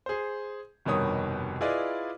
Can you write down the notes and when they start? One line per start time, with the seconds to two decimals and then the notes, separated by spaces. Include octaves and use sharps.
0.06 G#4 C5
0.85 F1 G2 B2 D#3 C#5 D#6
1.61 E4 F4 G#4 B4 D5 D#5